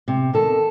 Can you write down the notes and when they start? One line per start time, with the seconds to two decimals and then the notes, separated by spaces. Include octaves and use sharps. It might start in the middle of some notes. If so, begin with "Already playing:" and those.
0.08 C3
0.33 D#3 A4